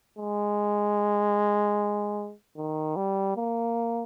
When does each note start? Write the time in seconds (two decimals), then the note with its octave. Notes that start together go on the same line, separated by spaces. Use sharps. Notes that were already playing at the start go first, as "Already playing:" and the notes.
0.18 G#3
2.57 D#3
2.96 G3
3.36 A#3